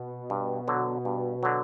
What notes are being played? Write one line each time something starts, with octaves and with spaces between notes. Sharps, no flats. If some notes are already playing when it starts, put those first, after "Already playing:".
Already playing: B2
G2
D3 F#3
G2
D3 F#3